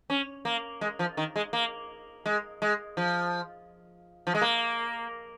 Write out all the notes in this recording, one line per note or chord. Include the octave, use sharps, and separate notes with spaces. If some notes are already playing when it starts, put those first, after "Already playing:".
C#4
A#3
G#3
F3
D#3
G#3
A#3
G#3
G#3
F3
F3
G#3
A#3